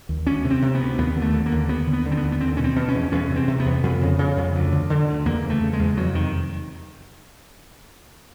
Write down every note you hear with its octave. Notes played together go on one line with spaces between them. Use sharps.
D#2
D2 C#4
C3
C4
C3
B3
D2
D#2 B3
D3
A3
D3
A#3
D#2
D#2 B3
D3
B3
D3
C4
B3
D#2
B3
E2 C4
B2 C#4
C4
B2
C#4
E2
E2 C#4
C3
C4
C3
B3
E2
F2
C#3
C#3
F2
D2
D3
D3
D2
E2 A#3
C#3
A3
C#3
G#3
E2
F2 F#3
C3 D#3